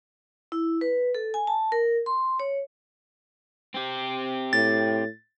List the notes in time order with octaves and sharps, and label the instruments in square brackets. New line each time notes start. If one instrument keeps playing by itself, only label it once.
[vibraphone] E4
B4
A4
G#5
A5
A#4
C6
C#5
[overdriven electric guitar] C4 G4
[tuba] A2 [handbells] A6